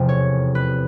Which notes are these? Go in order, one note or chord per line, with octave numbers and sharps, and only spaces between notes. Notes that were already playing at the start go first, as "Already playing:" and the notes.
Already playing: F1 E2 C3 F3
C#5
B4